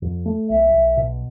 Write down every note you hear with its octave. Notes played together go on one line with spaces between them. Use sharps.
F2
A3
B1 E5
B1
B2